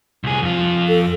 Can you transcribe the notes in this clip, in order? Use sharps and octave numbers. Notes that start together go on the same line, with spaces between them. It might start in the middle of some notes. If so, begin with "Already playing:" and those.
C2 G#4
F2 F4
A4